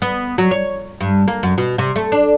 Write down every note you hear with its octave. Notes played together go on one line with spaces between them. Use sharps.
B3
F#3
C#5
G2
A#3
F#2
B2
C3
A3
D4